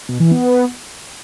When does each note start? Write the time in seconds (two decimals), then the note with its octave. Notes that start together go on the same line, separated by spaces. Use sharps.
0.09 B2
0.20 E3
0.31 B3